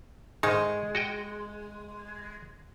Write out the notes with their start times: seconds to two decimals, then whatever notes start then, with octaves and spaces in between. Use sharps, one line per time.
0.43 G#2 D#3 G#3 D#4
0.95 F#4 D#5 G5